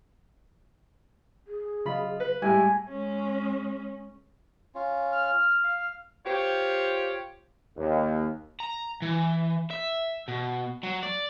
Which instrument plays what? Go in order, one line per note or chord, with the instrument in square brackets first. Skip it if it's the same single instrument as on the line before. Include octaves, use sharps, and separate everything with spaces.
[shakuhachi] G#4
[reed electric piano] C#3 F#3 D#5 [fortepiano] F4 B5
[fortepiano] B4
[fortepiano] A2 E4 [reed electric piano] G3 G#3 [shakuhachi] G4 [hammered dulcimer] G#5
[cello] G#3 C#4
[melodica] C#4 F4
[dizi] F6
[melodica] F5
[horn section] F4 G4 C5 C#5
[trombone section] D#2
[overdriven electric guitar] A#5
E3
E5
B2
F#3
D5